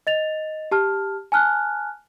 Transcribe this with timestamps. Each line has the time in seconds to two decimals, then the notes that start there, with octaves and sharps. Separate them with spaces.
0.07 D#5 A6 F7
0.71 G4 A5 F6
1.32 G#5 A5 F6 F#6